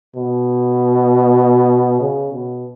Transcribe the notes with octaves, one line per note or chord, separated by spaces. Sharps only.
B2
C#3
B2